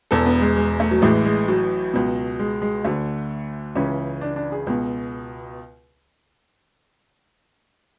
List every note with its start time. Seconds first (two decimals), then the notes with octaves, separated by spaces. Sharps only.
0.11 E1 E2 B2 A4
0.26 B3
0.41 G#3
0.57 G#3
0.80 A3
0.91 F#3
1.02 A1 A2 E3 G#3
1.25 G#3
1.48 F#3
1.94 C#2 B2
2.39 G#3
2.62 G#3
2.85 D2 D3 A3
3.75 C#2 C#3 E3 C#4
4.21 D4
4.36 D4
4.52 G#4
4.67 C#2 B2